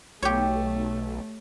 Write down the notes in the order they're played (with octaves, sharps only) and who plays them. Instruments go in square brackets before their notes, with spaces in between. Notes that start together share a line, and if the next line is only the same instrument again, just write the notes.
[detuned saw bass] B1 [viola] A3 [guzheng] G4 C#5